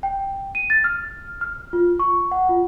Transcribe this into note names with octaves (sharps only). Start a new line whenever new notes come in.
G5
D#7
A6
F6
F6
F4
C#6
F#5
F4